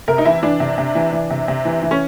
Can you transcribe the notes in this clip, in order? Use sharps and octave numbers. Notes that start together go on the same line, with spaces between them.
C3 A#4
D#4
E3 E4
E3 D4
C3
C3
E3
E3
C3
C3
E3
E3
C#4